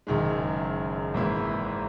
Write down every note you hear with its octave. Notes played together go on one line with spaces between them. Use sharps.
F#1 F#2 D#3 G#3
G#1 G#2 E3 A#3 E4